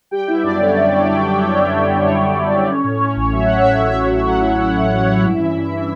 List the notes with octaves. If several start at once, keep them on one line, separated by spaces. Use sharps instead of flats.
G3 G4 G5
B3 E4 E5
F#2 D4 D5
D3 C#5
G3
G3
G3
G3
G3
D3
D3
G3
F#2 C#5
B3
B3
D3
C#4
A2
C#4
A1
F#3 E5
C#4 F#5
A2 E5
F#5
A1
E5
C#4 F#5
A2 E5
F#3 F#5
F#3 E4 E5
A2 E4 E5
A1
A1
C#4
G2
E3
G2
E3